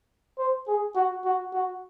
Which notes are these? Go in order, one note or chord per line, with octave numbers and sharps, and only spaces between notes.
C5
G#4
F#4
F#4
F#4